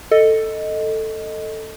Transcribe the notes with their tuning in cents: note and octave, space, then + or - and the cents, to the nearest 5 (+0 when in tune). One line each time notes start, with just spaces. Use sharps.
A4 +10 D#5 +0